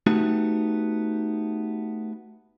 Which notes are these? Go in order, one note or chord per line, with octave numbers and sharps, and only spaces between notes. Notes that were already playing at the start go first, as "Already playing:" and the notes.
A3 B3 D#4 F#4 G4